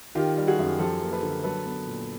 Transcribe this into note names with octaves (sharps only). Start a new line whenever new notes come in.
D#3 F4 G4
G3
F#4 G#4
F#2
F3 G4 A4
A#3
A4 B4
D3
F#3 A4 B4
B3
A#2